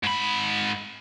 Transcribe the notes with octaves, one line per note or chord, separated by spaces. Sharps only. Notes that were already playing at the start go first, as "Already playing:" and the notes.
G#2 B5